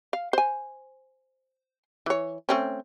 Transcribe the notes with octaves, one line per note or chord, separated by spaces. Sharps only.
F5
C5 G#5
E3 C#5
A3 C4 C#4